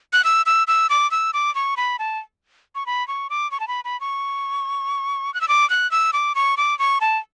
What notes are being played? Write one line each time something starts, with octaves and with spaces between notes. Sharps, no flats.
F#6
E6
E6
E6
D6
E6
D6
C#6
B5
A5
C#6
B5
C#6
D6
C#6
A5
B5
B5
C#6
F#6
E6
D6
F#6
E6
D6
C#6
D6
C#6
A5